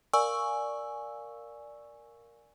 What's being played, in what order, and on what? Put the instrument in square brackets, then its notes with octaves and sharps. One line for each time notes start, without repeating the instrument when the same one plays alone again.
[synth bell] A#4 D5 F5 G#5 C#6 E6